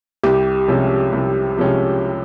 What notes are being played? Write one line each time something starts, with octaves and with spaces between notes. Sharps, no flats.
C2 G4
C3 F3 G#3 C#4
C2
C3 F3 G#3 C#4